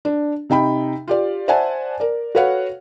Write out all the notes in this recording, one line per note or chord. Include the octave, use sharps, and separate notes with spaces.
D4
C3 D#4 G5 B5
F4 G4 D5
C5 D5 E5 F#5 G#5 A5
A#4 D5
F#4 A4 B4 C#5 F5 F#5